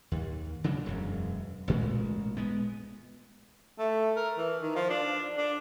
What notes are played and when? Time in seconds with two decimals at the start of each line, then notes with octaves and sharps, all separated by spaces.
0.12 D#2
0.64 C#3 F#3 D4
0.86 E1 F#2
1.68 A1 A#2 G#3
2.37 G#3 B3
3.79 A3
4.16 A#4
4.37 E3
4.62 D#3
4.76 F3
4.90 D4
5.37 D4